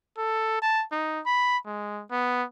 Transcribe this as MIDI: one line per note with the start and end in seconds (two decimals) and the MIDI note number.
0.18 0.60 69
0.62 0.84 81
0.92 1.20 63
1.26 1.58 83
1.66 2.03 56
2.11 2.44 59